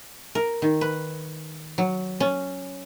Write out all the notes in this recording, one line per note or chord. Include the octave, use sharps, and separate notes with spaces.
A#4
D#3
B4
F#3
C#4